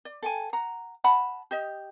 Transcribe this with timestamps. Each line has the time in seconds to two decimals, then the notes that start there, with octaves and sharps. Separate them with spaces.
0.05 D5
0.22 A4 G5 G#5
0.53 F#5 A#5
1.04 F#5 A5 B5
1.51 G4 D#5